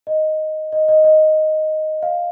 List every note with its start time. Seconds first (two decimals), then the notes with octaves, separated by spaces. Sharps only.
0.07 D#5
0.72 D#5
0.88 D#5
1.04 D#5
2.03 F5